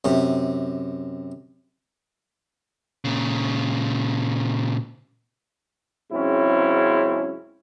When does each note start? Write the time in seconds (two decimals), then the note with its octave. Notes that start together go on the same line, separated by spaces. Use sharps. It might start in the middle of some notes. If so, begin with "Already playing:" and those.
0.05 F#2 C3
3.05 A#2 C#3
6.11 G#2 C#3 F#3 C4 C#4 E4